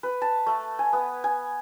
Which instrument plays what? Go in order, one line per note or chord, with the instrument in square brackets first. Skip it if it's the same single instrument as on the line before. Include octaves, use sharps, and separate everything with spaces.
[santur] B4
A5
A3
G#5
B3
G#5